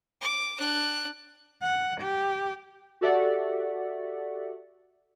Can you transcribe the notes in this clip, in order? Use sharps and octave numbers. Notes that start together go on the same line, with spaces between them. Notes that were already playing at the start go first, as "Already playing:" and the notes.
D6
D4 F#6
F#5
G4
F#4 G4 A4 D5 E5 F#5